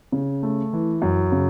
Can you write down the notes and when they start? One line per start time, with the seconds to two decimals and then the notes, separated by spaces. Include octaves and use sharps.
0.12 C#3
0.43 A3
0.73 E3
1.02 F#2
1.32 C#3